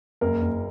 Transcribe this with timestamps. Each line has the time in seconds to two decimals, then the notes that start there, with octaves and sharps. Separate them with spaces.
0.21 F#1 A#3 A#4
0.42 F#1